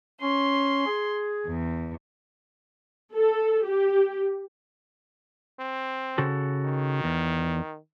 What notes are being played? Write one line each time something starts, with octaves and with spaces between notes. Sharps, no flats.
C#4 C6
G#4
E2
A4
G4
C4
C#3 F#4 A4
D#3
E2